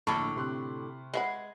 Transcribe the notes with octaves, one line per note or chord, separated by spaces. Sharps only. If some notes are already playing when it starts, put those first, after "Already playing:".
A#1 A2 D3 A5 B5 C#6 F6
C3 C6 F#6
G#3 B4 E5 F#5